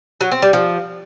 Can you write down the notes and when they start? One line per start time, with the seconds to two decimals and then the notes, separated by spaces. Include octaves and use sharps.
0.21 F#3
0.31 C4
0.42 G3
0.53 F3